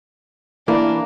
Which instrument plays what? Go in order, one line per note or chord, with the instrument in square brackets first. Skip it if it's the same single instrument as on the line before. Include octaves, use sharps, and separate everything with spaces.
[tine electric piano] E3 E4 [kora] A#3 [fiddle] D4